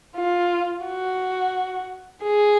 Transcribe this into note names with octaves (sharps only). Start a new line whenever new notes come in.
F4
F#4
G#4